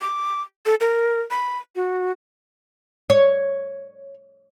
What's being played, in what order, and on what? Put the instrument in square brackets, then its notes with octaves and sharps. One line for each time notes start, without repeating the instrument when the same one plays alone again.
[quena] D6
A4
A#4
B5
F#4
[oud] C#5